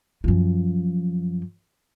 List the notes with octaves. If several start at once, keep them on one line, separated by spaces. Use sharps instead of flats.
F#2 F3